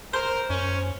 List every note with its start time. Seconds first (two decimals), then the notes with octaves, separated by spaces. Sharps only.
0.13 A#4 C5
0.50 F#2 C#4